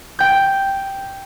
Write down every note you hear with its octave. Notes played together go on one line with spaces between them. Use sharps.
G5 G6